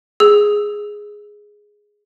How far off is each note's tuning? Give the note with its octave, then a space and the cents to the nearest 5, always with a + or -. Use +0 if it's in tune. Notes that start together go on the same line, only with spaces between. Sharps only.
G#4 +0 E6 +0